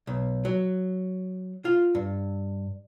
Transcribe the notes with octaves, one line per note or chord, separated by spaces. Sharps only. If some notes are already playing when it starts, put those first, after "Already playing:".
B1
F#3
F4
G2